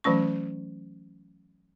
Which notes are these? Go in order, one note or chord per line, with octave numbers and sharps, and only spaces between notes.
E3 F#3 A3 C#4 C#6